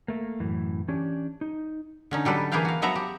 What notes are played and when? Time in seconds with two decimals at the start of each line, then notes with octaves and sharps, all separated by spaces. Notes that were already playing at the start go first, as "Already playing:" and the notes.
0.08 A3 A#3
0.40 F#2 A2 E3
0.88 E3 C#4 D4 G4
1.41 D#4
2.11 D3 C#4 D#4
2.25 F#3 G3 A4 B4
2.52 E3 A#3 G#4 B4 F5 G5
2.65 F#4 F5
2.82 F3 F#3 B3 E5 F#5 A#5
2.95 G4